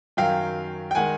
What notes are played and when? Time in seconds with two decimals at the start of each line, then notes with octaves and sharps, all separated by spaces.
0.17 F#2 D#3 F#3 F5 G5
0.91 G5
0.95 D#3 G#3 F#5 G#5